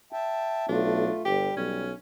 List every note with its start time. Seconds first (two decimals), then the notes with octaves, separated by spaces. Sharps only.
0.12 E5 G5 A5
0.69 B1 A3 D4 F4
1.25 G1 G3 G4
1.57 B1 C#4